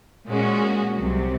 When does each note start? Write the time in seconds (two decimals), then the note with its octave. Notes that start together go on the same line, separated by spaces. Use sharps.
0.29 A#2 G#3 C#4 F#4
0.97 C2 C3 F#3